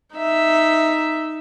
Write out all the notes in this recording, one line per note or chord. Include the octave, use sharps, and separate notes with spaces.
D#4 E5